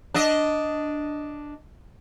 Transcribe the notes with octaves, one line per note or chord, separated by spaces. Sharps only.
D4 D#5